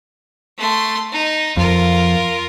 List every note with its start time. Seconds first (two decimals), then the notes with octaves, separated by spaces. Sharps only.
0.58 A3 C6
1.12 D#4
1.57 F2 F4 A#4